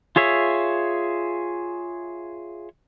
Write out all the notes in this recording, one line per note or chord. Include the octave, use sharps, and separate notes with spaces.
F4 G#4 C#5 E5